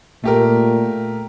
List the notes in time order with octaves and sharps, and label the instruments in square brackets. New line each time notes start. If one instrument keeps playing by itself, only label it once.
[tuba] A#2 [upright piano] A3 G4 A#4